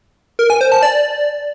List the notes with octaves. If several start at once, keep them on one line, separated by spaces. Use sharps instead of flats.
A#4
G#5
C5
A5
D5